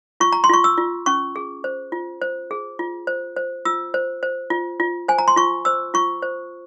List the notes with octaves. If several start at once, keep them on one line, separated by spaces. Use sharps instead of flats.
F4 C#6
A#5
C6
F4 C#6
E6
F4
C#4 C#6
G#4
C5
F4
C5
G#4
F4
C5
C5
F4 E6
C5
C5
F4
F4
C5 G#5
A#5
C6
F4 C#6
C5 E6
F4 C#6
C5